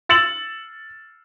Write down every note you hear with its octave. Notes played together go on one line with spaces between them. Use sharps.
E6 A6 C#7 E7 F#7